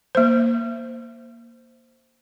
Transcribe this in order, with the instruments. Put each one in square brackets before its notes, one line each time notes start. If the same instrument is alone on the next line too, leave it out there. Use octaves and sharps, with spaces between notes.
[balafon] A#3 C5